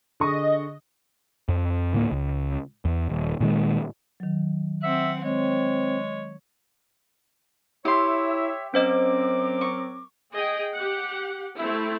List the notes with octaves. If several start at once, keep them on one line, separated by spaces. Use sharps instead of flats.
D3 G#4 D#5 C#6
F2
D2 A2 G#3 A#3
C#2
E2
D#1
A#2 D#3 G#3
D#3 F#3
C4 E5 F#5
G#3 C4 C#5
E4 G4 C#5 E5 C6
F#3 C4 C#4 A#4 C5 D#5 D6
C#6
G#4 D#5 G5
G4 F#5
A3 C4 E4